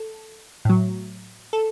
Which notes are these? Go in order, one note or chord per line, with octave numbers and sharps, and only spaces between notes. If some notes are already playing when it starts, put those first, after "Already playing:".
Already playing: A4
A2 F#3
A4